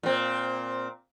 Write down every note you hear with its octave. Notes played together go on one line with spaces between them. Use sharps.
A#2 C4